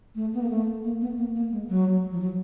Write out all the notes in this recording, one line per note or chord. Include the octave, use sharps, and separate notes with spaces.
A3
B3
A#3
A3
A#3
B3
A#3
A#3
G#3
F#3
F3
F#3